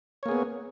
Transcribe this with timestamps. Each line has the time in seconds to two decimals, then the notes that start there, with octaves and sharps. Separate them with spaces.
0.23 C#5
0.26 A#3
0.29 G#4
0.31 B3